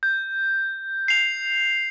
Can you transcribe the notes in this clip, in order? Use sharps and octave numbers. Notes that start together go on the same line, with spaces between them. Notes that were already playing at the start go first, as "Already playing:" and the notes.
G6
C7 F7